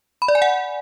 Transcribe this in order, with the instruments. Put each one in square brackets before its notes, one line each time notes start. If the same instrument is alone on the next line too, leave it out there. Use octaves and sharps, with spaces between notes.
[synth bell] B5
D5
G#5
F#5